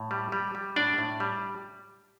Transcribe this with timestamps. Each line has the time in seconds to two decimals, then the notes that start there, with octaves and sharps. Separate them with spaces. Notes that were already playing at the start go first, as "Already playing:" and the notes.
Already playing: A2
0.11 G3
0.32 G3
0.55 G3
0.76 A2 D4 D5
0.98 A2
1.20 G3